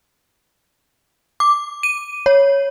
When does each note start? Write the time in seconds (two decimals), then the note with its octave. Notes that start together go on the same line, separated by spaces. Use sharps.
1.40 D6
1.83 D#7
2.26 C#5